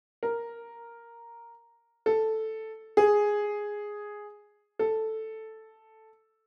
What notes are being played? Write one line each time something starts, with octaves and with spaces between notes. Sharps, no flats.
A#4
A4
G#4
A4